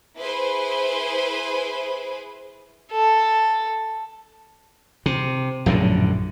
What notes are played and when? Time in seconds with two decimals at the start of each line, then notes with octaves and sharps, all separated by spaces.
0.18 E4 G#4 B4 C5
2.92 A4
5.06 C3
5.66 A#1 F#2 A2 D3